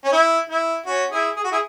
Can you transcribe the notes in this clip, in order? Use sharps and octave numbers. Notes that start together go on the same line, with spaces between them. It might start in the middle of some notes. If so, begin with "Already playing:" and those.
C#4
E4
E4
C#4 F#4
E4 G#4
G#4
F#4
E4 G#4